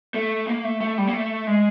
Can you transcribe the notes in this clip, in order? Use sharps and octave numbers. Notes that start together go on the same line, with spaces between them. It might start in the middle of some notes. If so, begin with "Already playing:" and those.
A3
A#3
A3
A3
G3
A#3
A3
G#3